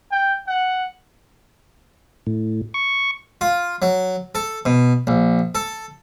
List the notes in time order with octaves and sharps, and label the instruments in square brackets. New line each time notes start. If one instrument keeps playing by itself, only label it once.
[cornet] G5
F#5
[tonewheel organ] A2
C#6
[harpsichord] F4
F#3
A4
B2
A#1
A4